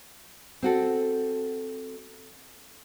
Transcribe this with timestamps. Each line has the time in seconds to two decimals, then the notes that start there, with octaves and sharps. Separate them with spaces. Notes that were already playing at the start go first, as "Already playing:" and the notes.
0.62 C4 F#4 A4